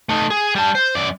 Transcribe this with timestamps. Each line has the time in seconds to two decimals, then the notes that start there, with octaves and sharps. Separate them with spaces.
0.09 A3 D#4
0.30 G#4
0.56 G3 A5
0.75 C5
0.95 F#2 D5